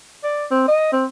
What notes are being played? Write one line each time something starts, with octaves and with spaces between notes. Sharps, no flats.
D5
C4
D#5
C4